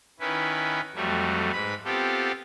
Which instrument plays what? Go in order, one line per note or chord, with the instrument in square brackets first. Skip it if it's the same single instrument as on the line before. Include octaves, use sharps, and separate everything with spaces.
[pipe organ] D#3 C#4 E4 B4
F2 F#3 G3 A3
G#2 B4 B5
B3 C4 F4 G4 A4